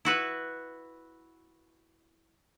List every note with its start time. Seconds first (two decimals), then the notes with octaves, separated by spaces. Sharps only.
0.05 E4 F#4 B4